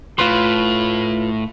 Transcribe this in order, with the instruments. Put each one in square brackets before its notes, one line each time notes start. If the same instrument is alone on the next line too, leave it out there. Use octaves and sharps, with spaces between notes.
[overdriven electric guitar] A2 [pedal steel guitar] F4 B4 C6